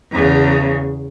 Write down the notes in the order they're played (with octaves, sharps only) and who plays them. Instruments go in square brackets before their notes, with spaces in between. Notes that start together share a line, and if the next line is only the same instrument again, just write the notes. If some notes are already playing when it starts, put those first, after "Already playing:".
[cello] E2 C#3